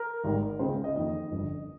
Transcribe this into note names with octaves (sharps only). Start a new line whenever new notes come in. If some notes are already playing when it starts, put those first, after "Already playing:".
Already playing: A#4
G#1 G#2 G3
C#2 C#3 G#3 C4 C5
D#5
F2 D#3 A#3 D#5
G1 F2 C#3